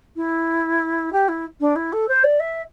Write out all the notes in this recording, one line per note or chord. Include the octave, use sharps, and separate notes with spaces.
E4
G4
E4
D4
E4
A4
C5
D5
E5